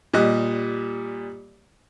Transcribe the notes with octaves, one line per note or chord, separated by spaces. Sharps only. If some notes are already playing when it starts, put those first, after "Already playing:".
A#2 G3 D#5 F#6